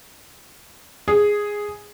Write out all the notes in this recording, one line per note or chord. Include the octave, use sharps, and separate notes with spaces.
G#4